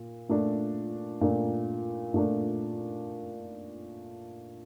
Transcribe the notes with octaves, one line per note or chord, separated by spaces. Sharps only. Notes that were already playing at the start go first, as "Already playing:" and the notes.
Already playing: A#2
A#2 A3 D4
A#2 A3 D4
A#2 A3 D4